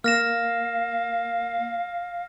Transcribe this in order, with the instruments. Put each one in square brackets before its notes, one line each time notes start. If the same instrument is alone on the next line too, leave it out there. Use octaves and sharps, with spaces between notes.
[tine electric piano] A#3 [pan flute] F5 [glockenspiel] F6 A#6 E7